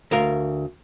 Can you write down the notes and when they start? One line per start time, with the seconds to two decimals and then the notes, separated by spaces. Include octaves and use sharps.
0.11 D2 A#4 F5